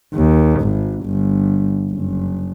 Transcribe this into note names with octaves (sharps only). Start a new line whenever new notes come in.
D#2
G#1
G1
F#1